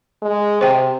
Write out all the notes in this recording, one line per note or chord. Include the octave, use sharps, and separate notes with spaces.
G#3
C3 C5 G5